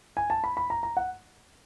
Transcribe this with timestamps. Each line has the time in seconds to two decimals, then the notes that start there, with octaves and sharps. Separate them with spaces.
0.17 G#5
0.30 A5
0.44 B5
0.57 B5
0.70 A#5
0.83 A#5
0.97 F#5